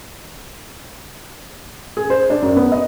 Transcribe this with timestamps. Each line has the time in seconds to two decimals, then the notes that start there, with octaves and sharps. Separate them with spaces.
1.97 G#4
2.10 C5
2.30 D4
2.42 F#2
2.56 B3
2.72 D#5